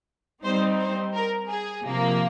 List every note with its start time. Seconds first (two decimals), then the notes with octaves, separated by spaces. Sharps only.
0.45 G3 C4 D#4 C5
0.80 C5
1.15 A#4
1.49 G#4
1.84 C3 F3 A#3